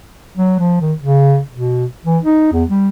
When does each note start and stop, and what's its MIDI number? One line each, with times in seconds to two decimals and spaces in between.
0.37 0.56 54
0.59 0.78 53
0.81 0.93 51
1.02 1.40 49
1.52 1.85 47
2.05 2.18 52
2.23 2.52 63
2.52 2.64 40
2.69 2.89 55